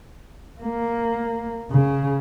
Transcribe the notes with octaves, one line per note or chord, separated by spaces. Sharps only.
A#3
C#3